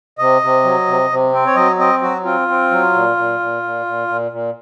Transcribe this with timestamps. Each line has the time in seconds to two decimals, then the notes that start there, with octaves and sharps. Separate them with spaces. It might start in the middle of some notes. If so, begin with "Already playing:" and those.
0.18 C3 D#5
0.42 C3
0.64 F#3
0.87 C3
1.10 C3
1.33 C4
1.46 C#5
1.56 F#3 D#5
1.79 C4 D#5
2.02 F#3 F#4
2.24 C4 F4
2.48 C4
2.71 F#3
2.93 A#2
3.16 A#2
3.39 A#2
3.63 A#2
3.86 A#2
4.08 A#2
4.31 A#2